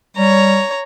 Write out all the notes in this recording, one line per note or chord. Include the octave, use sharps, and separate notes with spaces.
G3 C#5 A#5